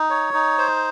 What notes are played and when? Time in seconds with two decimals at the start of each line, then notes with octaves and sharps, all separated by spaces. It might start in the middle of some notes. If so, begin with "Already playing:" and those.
Already playing: D#4
0.10 C#5
0.34 D#4
0.58 C5